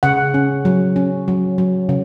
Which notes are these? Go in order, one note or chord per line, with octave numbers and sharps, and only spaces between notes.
C#3 F#5
C#4
F#3
C#4
F#3
F#3
C#3